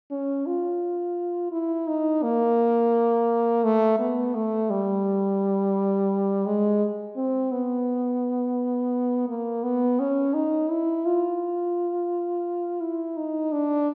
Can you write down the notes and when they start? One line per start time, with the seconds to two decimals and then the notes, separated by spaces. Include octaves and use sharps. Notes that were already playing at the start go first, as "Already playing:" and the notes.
0.10 C#4
0.46 F4
1.52 E4
1.87 D#4
2.23 A#3
3.64 A3
3.99 B3
4.34 A3
4.70 G3
6.46 G#3
7.16 C4
7.51 B3
9.28 A#3
9.63 B3
9.99 C#4
10.34 D#4
10.70 E4
11.05 F4
12.81 E4
13.17 D#4
13.52 D4